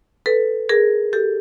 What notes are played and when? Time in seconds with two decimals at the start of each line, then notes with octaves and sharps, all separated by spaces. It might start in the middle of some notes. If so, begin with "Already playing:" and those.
0.26 A4 B4
0.69 G#4 A#4
1.13 G4 A4